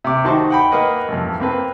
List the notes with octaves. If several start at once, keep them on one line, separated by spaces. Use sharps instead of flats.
C3 D6
D#3 D#4 F#4 C5 A5
F#5 G5 B5
A#3 A#4 B4 D#5 F#5
A1 F2
A#3 C4 B4